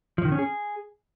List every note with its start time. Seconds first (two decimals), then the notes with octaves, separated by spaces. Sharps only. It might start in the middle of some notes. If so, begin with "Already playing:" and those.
0.18 F3
0.25 D#3
0.32 C#4
0.39 G#4